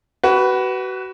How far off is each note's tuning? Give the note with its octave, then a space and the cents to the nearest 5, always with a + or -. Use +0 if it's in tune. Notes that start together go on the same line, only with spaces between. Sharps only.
F#4 +30 B4 +0